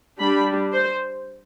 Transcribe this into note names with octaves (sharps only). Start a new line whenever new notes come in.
G3 D4 B5
C5